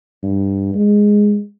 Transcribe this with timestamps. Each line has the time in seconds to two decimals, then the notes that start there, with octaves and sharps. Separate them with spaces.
0.23 G2
0.74 G#3